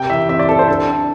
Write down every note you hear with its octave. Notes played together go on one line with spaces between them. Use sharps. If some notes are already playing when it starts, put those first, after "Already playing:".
Already playing: C3 G5
E3 E5
C4 E5
D5
C4 A4
C5
D4 A4
D4